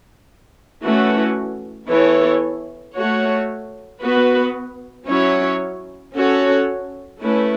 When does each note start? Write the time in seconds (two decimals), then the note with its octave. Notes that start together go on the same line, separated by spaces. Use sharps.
0.83 E3 A3 C#4 F#4
1.89 E3 B3 E4 A4 C#5
2.95 A3 F#4 C#5
4.01 B3 F#4 B4
5.08 F#3 C#4 E4 C#5
6.14 C#4 F#4 A4 C#5
7.20 A3 C#4 E4 B4